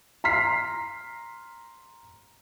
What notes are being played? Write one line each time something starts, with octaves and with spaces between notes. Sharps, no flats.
A#5 C6 F6 B6 C7